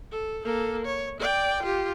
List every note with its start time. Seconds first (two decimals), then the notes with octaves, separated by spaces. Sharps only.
0.12 A4
0.45 A#3 A4
0.85 C#5
1.20 D5 G5
1.63 F4 G4